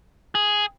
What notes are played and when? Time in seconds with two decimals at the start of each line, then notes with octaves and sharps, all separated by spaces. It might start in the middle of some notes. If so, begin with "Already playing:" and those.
0.35 G#4